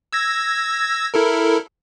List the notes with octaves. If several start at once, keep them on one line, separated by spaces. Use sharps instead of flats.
E6 G#6 A#6
E4 A4 A#4